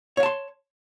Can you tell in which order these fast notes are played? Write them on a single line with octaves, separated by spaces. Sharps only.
C#5 F5 A5 C6